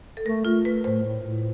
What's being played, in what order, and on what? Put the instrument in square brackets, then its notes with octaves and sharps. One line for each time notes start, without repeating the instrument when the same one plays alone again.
[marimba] A4
[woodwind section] A3 [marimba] A#4
[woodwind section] A3 [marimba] F4
[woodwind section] A3 [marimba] B4
[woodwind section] A2 [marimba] C5
[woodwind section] A2
A2